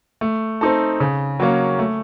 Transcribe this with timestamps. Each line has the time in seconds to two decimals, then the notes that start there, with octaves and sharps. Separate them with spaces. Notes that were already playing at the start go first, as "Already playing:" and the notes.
0.21 A3
0.61 C4 D#4 A4
1.00 C#3
1.40 F#3 A#3 C#4
1.79 A3